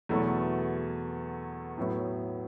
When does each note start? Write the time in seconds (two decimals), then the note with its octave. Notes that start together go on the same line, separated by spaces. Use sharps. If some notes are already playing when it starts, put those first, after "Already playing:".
0.09 E2 B2 F#3 A3 E4
1.77 A2 F#3 B3 E4